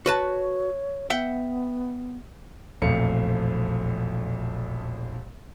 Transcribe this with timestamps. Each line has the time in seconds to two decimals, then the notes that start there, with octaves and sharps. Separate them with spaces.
0.06 F#4 B4 C#5 A5
1.10 B3 E5 F#5 G5
2.82 E1 A#1 F2 A3 F5 C#7